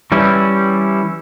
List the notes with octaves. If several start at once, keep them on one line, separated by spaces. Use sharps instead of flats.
E3 G3 C#4 E4